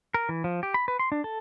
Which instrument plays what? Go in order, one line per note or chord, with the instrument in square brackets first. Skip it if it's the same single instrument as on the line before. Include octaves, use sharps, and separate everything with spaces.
[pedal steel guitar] A#4
E3
F3
G4
B5
B4
C6
D4
A4